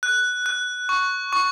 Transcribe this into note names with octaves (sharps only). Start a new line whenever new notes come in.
F#6
F#6
C#6
C#6